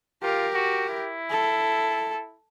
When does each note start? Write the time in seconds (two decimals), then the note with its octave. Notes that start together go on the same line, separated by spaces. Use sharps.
0.22 F4 G4 A#4
0.54 F#4
0.89 E4
1.31 A4